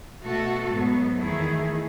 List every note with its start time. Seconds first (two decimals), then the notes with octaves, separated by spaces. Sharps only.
0.22 B2 A3 F#4 A4
0.71 G#2 F#3 B3
1.18 E2 D#3 A3 E4 G#4